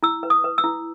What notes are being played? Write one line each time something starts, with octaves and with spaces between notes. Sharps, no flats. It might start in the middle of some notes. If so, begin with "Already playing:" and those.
E4 E6
B4
D#6
B4
E6
E4